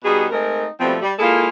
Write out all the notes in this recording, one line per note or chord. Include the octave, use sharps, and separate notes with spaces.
B2 G3 D#4 F#4 G#4
G#3 A3 C4 D#4 A#4
B2 F3 G3 A3 C4
G3
G#3 A#3 E4 F4 G#4 A4